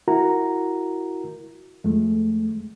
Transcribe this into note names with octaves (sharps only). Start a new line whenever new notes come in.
E4 F#4 A#4 A#5
F2 G#3 A3